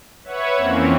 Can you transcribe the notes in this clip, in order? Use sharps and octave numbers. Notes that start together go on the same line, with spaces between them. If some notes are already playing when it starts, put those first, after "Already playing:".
B4 C#5 E5 F#5 C#6 G#6
F2 E3 A#3 C4 C#4